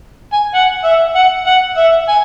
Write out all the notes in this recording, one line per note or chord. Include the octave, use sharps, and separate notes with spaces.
G#5
F#5
E5
F#5
F#5
E5
G#5